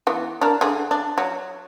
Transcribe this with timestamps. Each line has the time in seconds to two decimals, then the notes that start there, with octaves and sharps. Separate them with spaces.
0.07 E3 B3
0.41 D4 A#4
0.61 D3 G#4
0.91 D4
1.18 F#3